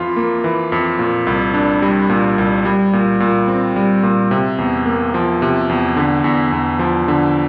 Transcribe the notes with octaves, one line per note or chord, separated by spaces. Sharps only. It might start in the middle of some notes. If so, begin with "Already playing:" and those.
Already playing: F2 E3 F4
A#3
E3
F2
A#2
C2
D4
G3
A#2
C2
G3
A#2
A#2
C4
G3
A#2
C3
E2
A#3
F3
C3
E2
D3
E2
E2
F3
D3